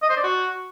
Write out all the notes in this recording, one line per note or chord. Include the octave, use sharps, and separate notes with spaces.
D#5
C5
D5
F#4